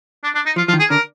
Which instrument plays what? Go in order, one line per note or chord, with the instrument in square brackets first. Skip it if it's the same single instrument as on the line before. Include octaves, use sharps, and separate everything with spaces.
[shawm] D4
D4
D#4
[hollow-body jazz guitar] F3 [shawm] F4
[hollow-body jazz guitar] F3 [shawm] F4
[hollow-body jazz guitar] D#3
[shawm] G#4
[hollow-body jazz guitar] D3 [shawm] A#4